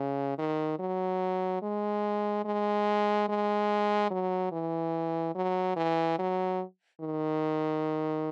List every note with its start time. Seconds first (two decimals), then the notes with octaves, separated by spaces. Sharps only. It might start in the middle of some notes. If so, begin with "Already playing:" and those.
Already playing: C#3
0.38 D#3
0.79 F#3
1.62 G#3
2.45 G#3
3.29 G#3
4.10 F#3
4.52 E3
5.35 F#3
5.76 E3
6.19 F#3
7.01 D#3